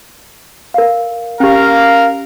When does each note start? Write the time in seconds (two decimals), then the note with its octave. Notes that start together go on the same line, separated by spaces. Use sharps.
0.74 A#4 F5
1.40 C#4 G4 A#4 F5